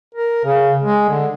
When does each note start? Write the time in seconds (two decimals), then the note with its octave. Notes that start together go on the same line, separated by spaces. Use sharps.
0.15 A#4
0.44 C#3
0.83 G#3
1.09 D3